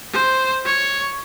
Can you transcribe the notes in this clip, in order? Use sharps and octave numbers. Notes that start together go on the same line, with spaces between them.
C5
C#5